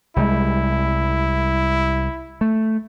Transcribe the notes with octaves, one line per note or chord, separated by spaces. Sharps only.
C2 G3 G#3 E4
A3